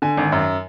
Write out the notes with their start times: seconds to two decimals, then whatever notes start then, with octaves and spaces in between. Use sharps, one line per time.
0.02 D3 G#5
0.17 G#1
0.32 F#2